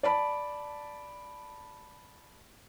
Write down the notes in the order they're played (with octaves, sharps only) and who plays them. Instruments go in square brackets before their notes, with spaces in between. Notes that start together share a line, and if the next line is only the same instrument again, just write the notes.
[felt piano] D5 A5 B5